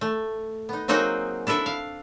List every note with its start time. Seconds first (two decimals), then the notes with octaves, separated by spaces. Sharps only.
0.01 A3
0.69 B3 D#4
0.88 F#3 A#3 C4 D#4 F#4 G#4
1.47 D4 E4 A4 E5
1.66 F5